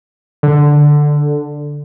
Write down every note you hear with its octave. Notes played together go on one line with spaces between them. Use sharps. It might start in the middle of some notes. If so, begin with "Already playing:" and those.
D3